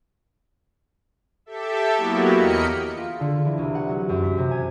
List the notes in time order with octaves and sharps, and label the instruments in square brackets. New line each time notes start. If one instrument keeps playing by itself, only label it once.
[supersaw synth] G4 A4 E5
F#3 A#3 B3 E4 F#4 G4
E2 A#4 D#5 B5 C#7
[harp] F4
D3
E3
C2
F#5
F#3
F#2
B6
C3
G#5